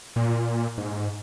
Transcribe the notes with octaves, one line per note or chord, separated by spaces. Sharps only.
A#2
G#2